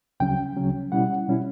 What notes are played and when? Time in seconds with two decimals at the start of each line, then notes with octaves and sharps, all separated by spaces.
0.20 D2 C#3 F#3 C#4 G5
0.56 D2 C#3 F#3 C#4
0.92 B2 G3 C#4 E4 F#5
1.28 B2 G3 C#4 E4